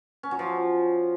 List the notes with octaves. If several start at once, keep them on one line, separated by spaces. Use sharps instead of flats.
C#4
F#3
F3